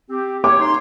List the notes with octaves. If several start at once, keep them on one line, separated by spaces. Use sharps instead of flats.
C4 G4
C#5 D6
D#4 C6